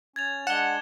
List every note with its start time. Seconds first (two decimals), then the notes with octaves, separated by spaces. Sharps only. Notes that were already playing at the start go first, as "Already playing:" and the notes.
0.16 C#4 G#6 A6 F7
0.47 G#3 D4 F#5 E7 G7